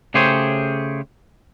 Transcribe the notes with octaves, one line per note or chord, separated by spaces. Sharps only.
C#3 A3 G4 G#4 C5 C#5